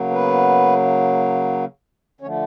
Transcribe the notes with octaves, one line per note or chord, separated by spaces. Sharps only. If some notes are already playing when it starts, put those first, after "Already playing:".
Already playing: C#3 F#3 A#3
B3 B4
D3 F3 A3 C#4 C#5